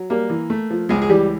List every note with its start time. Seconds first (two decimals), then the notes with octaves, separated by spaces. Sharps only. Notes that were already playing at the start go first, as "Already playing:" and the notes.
Already playing: F#3
0.10 G3 A#3 A#4
0.30 E3
0.50 A3
0.71 F3
0.89 C#2 G#3 G#4
1.02 G#4
1.09 E3 G3 G4